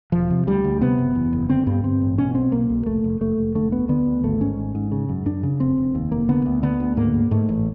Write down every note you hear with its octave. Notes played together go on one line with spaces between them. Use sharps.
E1 F3
C3
D2 G3
D2
C3 B3
F#1
E2
F#1
D3 C4
G2 B3
G2 C4
A1
B2 C#4
B1 C4
B1 A#3
B1
F1 A3
F1
F1 A3
F1
D3 A3
D2 B3
D3 B3
D2
G#1 A3
G#2 C#4
G#1
G#2
C#3
F#2
F#2 D4
C#3
F1 C4
F1
D#2
F1 A#3
D3 B3
D2
D3 B3
D2
G#2 A#3
G#2
G#2 A3
A1